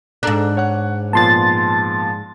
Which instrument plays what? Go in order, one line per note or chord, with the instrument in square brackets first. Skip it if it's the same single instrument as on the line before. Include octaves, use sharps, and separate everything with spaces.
[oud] G#2 D4 [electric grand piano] A4 A#5 F#6
[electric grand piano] C#5 F#5 F#6
[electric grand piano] A#2 F3 B3 [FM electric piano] A5 C6 A6